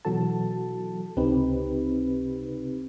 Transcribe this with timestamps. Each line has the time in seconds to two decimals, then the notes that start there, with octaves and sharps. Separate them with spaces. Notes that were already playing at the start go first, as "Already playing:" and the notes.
0.05 B2 E3 F#3 F#4 A4 A5
1.17 C#2 C3 C4 D#4 G4 B4